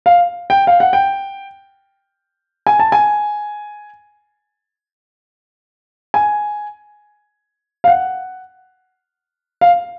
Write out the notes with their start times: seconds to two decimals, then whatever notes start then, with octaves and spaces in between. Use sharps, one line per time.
0.06 F5
0.50 G5
0.67 F5
0.80 F#5
0.93 G5
2.67 G#5
2.79 A5
2.92 G#5
6.14 G#5
7.84 F5
7.88 F#5
9.61 F5